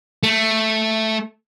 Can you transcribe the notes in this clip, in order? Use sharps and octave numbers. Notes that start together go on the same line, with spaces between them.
A3